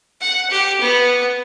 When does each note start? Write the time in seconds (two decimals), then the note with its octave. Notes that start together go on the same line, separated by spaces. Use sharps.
0.21 F#5
0.51 G4
0.81 B3